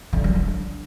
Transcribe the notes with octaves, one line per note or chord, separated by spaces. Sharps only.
D3
F#3
D4